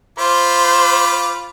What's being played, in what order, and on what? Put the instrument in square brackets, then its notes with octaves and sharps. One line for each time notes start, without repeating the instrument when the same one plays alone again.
[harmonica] F4 B5 D6 [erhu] C5